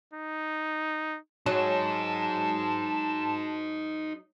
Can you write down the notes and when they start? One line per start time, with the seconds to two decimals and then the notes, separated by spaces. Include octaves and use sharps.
0.13 D#4
1.46 F#3 D#4 G#4 A5